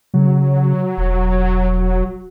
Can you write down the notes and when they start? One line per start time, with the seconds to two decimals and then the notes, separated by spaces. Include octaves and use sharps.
0.14 C#3 F#3
0.97 E1